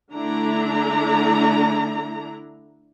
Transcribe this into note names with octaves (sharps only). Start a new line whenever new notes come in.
D3 A3 D4 E4 A#5